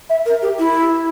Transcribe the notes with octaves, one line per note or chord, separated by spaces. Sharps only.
E5
A#4
G4
E4